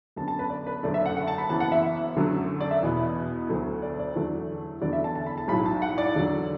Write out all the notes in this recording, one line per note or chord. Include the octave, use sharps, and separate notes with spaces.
F#2 D3 B3 A5
A5
B4
D5
B4
F#1 F#2 D3 A3 D5
E5
F#5
F#5
A5
B5
F#1 F#2 E3 B3 A5
F#5
E5
F#2 D3 F#3 A3
D5
E5
E2 B2 B3
D2 D3 F#3 A3
D5
D5
E2 D3 F#3 A3
E2 D3 F#3 B3 D5
E5
A5
A5
B5
A5
B1 A2 F#3 B5
A5
F#5
D5
E2 D3 F#3